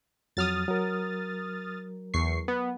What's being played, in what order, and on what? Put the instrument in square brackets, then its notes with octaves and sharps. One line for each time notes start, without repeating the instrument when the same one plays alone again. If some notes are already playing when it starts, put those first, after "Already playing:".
[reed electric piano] F2 F#3 [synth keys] D#6 F6 A6
[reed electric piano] F#3 A#4
[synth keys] E2 C#6 C7
B3